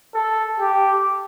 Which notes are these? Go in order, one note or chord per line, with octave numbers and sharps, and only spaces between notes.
A4
G4